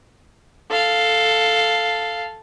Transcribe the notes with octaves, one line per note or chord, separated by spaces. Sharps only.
A4 F5